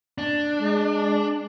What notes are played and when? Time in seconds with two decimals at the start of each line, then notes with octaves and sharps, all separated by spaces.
0.18 D4
0.59 G#3